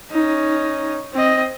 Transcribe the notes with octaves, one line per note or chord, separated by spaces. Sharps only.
C#4 D#4
C4 D#5